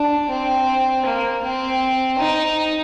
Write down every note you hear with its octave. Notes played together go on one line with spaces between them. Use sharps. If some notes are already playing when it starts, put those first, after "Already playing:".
Already playing: D4
C4
A#3
C4
D#4